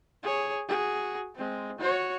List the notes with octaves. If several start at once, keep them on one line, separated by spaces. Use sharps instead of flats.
G#4 C#5
F#4 G#4
G#3 C4
F#4 C#5